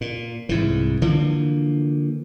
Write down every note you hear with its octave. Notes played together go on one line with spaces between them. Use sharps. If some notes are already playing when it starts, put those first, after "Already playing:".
A#2
C2 G#2 E3
D3 E3 F3 A#3